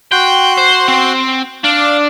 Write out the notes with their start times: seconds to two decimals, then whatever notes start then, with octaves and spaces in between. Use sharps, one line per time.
0.12 F#4 G5 C6 F#6
0.58 C5
0.88 C4
1.64 D4 D5 F5